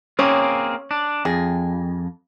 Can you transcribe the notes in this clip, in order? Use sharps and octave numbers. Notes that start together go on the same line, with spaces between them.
A#3 C4 C#4 G#4 C#5
D4
F2 G#4